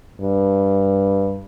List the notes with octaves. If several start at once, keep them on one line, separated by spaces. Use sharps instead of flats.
G2